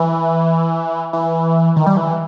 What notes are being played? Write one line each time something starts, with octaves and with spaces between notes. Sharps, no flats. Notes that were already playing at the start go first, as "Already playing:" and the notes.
Already playing: E3
E3
D#3
G3
E3